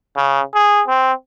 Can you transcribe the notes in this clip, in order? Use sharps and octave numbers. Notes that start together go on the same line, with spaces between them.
C#3
G#4
C4